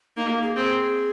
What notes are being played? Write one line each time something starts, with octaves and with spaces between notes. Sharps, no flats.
A#3 D#4
A#4
G#4
C4 G#4